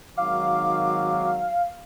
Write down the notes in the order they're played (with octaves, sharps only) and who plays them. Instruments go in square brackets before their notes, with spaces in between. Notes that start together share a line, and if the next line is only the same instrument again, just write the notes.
[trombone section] G#1 D#3 F#3 [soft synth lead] F5 [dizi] D6